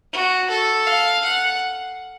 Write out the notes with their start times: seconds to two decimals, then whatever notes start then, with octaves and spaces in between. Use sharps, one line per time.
0.13 F#4
0.50 A4
0.87 F5
1.25 F#5